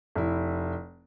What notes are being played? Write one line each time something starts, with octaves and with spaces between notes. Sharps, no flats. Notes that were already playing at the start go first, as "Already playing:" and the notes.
F1 E4